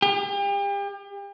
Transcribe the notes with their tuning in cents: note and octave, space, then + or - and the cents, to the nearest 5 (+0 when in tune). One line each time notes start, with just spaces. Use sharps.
G4 +40